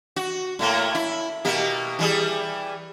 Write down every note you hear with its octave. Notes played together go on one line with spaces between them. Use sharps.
F#4
A2 A3 A#3
E4
B2 A#3 G4
E3 G3 G#4